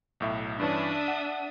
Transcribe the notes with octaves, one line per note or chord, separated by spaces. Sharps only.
B1 A2 E5
G2 E3 C#4 D4 E5 D#6
F#5